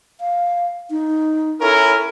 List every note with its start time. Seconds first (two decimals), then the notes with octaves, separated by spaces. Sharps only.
0.21 F5
0.91 D#4
1.61 C#4 E4 A4 A#4